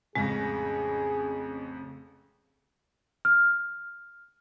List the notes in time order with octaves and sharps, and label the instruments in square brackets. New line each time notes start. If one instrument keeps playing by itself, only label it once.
[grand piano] A1 F2 A#6 [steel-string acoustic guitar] C#3 [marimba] G#3 [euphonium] G#4
[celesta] F6